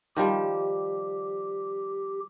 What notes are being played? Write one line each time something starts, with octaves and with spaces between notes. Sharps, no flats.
D#3 F3 G3 G4